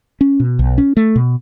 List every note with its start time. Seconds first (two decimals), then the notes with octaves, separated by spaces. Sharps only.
0.21 C#4
0.40 B2
0.59 B1
0.78 C#4
0.97 A3
1.16 B2